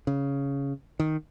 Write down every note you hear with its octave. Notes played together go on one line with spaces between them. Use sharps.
C#3
D#3